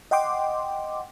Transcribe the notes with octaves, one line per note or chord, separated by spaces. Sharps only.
D#5 F#5 G5 C6 D6